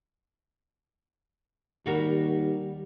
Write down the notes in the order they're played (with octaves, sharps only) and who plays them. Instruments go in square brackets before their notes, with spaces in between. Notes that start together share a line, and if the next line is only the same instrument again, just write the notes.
[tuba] D#2 [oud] G3 F#4 A#4